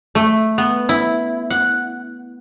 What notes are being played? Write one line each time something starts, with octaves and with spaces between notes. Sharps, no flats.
A3
B3
E4
F#5